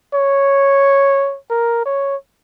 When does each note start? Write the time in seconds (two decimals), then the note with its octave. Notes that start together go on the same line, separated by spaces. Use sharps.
0.14 C#5
1.50 A#4
1.86 C#5